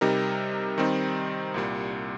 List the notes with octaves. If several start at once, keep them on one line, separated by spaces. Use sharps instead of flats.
C3 G3 D#4 A#4
D#3 G3 C4 D#4
C2 A#2 G3